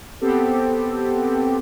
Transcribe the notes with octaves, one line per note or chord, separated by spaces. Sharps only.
B3 C4 G4 A4